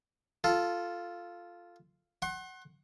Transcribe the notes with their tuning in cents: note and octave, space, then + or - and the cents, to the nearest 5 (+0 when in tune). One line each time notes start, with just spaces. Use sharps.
F4 +0 A4 +0
F#5 +15 C6 +40